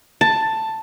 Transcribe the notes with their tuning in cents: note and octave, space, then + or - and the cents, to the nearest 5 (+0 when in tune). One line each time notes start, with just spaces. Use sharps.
A5 +10